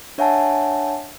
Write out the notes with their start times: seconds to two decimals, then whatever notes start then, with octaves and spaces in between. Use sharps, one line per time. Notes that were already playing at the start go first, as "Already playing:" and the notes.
0.18 D4 C#5 E5 F#5 G#5 A5